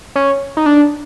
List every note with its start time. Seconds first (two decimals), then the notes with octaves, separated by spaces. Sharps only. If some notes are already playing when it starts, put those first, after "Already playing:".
0.16 C#4
0.57 D#4
0.66 D4